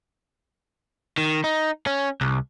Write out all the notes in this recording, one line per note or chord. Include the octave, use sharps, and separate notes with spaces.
D#3
D#4
C#4
C2